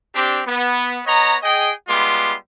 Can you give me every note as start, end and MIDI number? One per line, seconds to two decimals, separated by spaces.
0.15 0.42 60
0.15 0.42 62
0.15 0.42 67
0.47 1.00 59
1.07 1.37 59
1.07 1.37 73
1.07 1.37 75
1.07 1.37 82
1.43 1.72 68
1.43 1.72 75
1.43 1.72 79
1.89 2.35 55
1.89 2.35 56
1.89 2.35 59
1.89 2.35 65
1.89 2.35 84
1.89 2.35 86